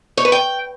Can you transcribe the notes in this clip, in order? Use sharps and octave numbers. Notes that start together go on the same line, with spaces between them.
C#5
B4
G5